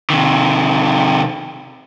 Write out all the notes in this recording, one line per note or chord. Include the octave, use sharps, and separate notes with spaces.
C3 D#3